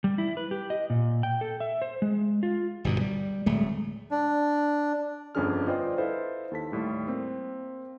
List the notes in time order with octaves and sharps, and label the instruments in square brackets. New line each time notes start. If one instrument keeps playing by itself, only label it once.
[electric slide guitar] G3
E4
B4
G4
D#5
A#2
G5
A4
E5
C5
G#3
F4
[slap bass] G1 G2 B2
G3
D1 G#3 A3
[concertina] D4
[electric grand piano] G1 F2 C#4 D4 G#4 F6
F4 B4 C5 D5 D#5 G5
E4 A4 B4 C5 D#5 F5
D#2 A4 A5 B6
D#2 A2 G3
A#3 C4